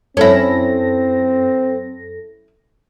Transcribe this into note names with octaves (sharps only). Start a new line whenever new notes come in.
F#2 C4 C#4 E4 A4 A#6